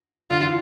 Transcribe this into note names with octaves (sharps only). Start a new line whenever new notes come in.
D3 F4
E3